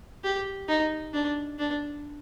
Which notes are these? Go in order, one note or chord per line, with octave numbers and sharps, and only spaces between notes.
G4
D#4
D4
D4